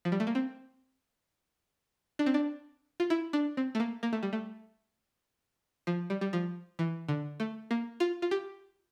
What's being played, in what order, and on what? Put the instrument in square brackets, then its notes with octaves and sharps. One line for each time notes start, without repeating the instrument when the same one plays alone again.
[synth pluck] F3
G3
A3
A#3
C4
D4
C4
D4
F4
E4
D4
C4
A3
A#3
A#3
A3
G3
A3
F3
G3
G3
F3
E3
D3
A3
A#3
F4
F4
G4